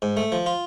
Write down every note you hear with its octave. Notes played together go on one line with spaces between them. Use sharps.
G#2
A3
F3
F4